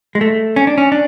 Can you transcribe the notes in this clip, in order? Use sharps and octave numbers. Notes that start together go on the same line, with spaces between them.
G#3
A3
C#4
D4
C#4
D4